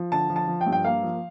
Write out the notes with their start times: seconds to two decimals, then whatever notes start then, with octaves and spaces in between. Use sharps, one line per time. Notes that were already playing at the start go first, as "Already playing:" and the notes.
Already playing: F3
0.12 D3 A5
0.30 F3
0.36 A5
0.47 F3
0.61 G5
0.66 G2
0.72 G5
0.84 A#3 F5
1.03 F3